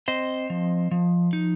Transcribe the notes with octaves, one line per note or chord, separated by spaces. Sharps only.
C4 C5 D#5
F3
F3
D#4